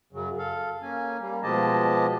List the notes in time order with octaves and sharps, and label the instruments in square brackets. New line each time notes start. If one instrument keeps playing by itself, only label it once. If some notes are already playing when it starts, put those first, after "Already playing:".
[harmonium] F#2 C#3 F#3
A4 F5
A#3 C#4 G#5
G3 A#3
B2 F3 G#3 G4 D#5 A5